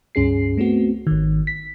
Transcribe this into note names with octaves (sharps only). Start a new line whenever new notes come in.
C#2 G2 C#4 G#4 C7
A3 B3 C4 F#4
G#1 D#3
B6